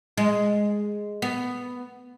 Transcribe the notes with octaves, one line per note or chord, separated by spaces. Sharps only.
G#3
B3